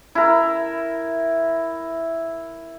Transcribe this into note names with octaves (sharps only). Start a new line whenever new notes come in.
E4 A#4